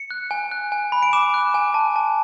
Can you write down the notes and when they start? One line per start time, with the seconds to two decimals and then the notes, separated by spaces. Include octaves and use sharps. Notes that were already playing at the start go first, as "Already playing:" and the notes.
Already playing: C#7
0.11 F#6
0.31 G#5
0.52 F#6
0.72 G#5
0.92 B5
1.03 D7
1.13 D6 E7
1.34 F#6
1.54 G#5
1.74 A5
1.96 A5